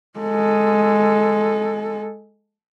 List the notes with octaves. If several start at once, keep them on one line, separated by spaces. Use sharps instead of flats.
G#3 A4